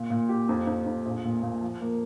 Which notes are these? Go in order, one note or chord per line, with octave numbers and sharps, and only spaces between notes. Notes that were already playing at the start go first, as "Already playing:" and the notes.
Already playing: A#2
A#2
G4
F2
F2
F2
A#1
A#2
A#2
F3
A#3